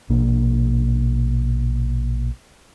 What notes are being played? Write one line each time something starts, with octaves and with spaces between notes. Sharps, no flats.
A#1 B2 A#3 D4